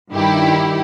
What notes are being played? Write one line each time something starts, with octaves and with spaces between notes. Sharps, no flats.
G2 D#3 E4 G4